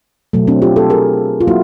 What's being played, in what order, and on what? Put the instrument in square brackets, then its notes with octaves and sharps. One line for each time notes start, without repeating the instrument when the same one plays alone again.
[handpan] B2 F#3 A3
C4 D4
F4 G4
G4 A4
G#4 A#4
F4
F#3 A#3 E4 F#4